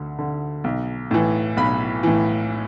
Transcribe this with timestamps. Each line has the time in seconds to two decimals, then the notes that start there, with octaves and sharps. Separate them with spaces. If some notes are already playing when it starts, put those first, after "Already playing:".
Already playing: D2 D3
0.19 D3
0.64 B1
1.11 A2 E3
1.57 B1 B5
2.03 A2 E3